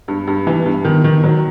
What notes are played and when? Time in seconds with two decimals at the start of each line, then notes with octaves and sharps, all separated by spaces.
0.08 G2
0.27 G2
0.47 E3
0.66 G2
0.85 D#3
1.04 D#3
1.24 F#3